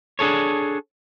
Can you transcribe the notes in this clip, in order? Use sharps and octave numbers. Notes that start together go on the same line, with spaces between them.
D4 G#4 A4 C#5